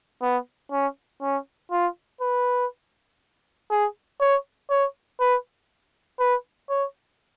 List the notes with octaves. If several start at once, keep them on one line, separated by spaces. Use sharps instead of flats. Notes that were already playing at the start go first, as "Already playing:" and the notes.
B3
C#4
C#4
F4
B4
G#4
C#5
C#5
B4
B4
C#5